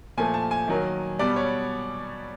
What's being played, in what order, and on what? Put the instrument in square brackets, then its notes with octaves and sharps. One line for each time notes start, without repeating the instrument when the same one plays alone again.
[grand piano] A#2 F3 A3 G#5
A5
G#5
D#3 F#3 A#3
B2 G3 B3 D5
C#5